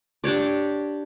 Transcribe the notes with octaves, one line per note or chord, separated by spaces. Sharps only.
D4 G4 C#5 D5